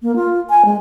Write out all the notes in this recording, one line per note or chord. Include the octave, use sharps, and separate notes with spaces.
A#3
F4
G#5
G#3